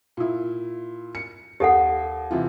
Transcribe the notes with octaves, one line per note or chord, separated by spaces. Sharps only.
A#2 E4
C#7
D#2 G4 A4 F#5
C3 E3 F4